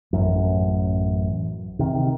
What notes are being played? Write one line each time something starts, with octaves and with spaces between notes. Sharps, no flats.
A1 F#2
C3 D#3